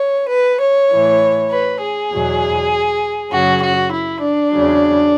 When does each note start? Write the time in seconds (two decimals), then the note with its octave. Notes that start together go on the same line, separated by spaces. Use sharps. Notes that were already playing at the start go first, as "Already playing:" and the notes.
Already playing: C#5
0.31 B4
0.62 C#5
0.92 A2 E3
1.51 B4
1.82 G#4
2.12 E2 B2 F#3
3.32 F#2 C#3 F#3 F#4
3.62 F#4
3.92 E4
4.22 D4
4.52 E2 C#3 F#3